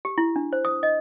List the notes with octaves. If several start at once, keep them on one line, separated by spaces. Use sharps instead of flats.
G4
E4
D4
C5
D#6
D#5